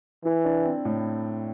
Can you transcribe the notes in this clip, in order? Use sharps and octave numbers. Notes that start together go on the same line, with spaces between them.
E3 E4
D4
C4
A2